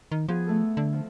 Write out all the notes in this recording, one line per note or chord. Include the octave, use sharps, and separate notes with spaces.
D#3
F3 B3 G#4
A3 A4
D3
F3